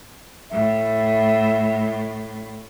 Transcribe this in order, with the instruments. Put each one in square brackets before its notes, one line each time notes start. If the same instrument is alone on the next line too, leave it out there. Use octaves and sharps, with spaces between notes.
[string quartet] A2 [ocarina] E5